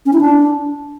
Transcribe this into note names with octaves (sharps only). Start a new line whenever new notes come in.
C#4
E4
D4